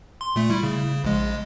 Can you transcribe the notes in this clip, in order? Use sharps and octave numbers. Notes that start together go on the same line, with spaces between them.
C6
A#2 A3
G3 E4
C#3
A#1 G#3